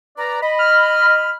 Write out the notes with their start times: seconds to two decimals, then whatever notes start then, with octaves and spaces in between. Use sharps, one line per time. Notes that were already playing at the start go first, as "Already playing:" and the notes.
0.17 B4 D5 A#5
0.42 D#5 B5
0.59 F6